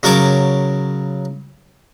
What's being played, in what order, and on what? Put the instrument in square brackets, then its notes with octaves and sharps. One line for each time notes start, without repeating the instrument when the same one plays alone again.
[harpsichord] C#3 F#3 A#4 C#5 A5 D6